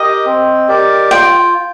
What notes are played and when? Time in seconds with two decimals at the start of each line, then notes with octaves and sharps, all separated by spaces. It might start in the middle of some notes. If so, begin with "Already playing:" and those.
Already playing: G4 A#4 D#5
0.25 C4
0.68 G4 A#4 D5
1.11 F4 G5